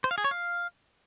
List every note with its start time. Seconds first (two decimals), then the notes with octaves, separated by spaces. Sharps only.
0.04 C5
0.11 F5
0.18 G#4
0.24 C#5
0.31 F5